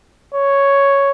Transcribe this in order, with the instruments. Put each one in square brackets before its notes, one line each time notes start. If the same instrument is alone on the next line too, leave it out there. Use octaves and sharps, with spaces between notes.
[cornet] C#5